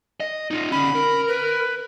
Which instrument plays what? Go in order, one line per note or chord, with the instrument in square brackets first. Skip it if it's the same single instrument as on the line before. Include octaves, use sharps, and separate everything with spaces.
[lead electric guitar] D#5
D#4 F4
[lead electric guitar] D3 C#4 [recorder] B5
[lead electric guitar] A#4
[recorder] B4